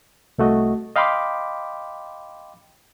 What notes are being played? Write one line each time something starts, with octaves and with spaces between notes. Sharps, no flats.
C2 A3 F#4 D#5
D#5 F5 G5 B5 C6 D6